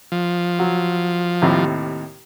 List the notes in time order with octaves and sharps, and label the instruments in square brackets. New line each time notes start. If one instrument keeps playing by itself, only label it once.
[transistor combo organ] F3
[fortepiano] F#3
D#2 A2 C3